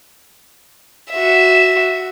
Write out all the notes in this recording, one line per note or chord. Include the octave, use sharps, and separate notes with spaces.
F#4 E5